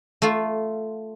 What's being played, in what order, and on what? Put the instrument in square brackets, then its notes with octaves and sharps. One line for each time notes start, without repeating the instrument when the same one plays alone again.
[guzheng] A3 F4